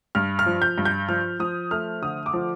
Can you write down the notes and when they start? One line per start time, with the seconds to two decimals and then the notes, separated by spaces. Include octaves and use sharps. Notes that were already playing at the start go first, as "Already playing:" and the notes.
0.15 G2 F6
0.39 F6
0.46 F3
0.62 G6
0.78 G2
0.85 G6
1.09 F3 F6
1.40 F3 D#6
1.71 A3 F6
2.02 D3 D#6
2.26 D6
2.33 F3